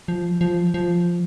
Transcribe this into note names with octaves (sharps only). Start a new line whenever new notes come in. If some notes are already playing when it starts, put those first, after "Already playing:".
F3
F3
F3